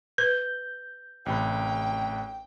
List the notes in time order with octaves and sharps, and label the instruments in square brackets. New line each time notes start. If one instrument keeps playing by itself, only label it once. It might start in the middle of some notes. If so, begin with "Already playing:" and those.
[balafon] B4 [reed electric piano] G6
[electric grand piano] A1 C3 B5 [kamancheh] G5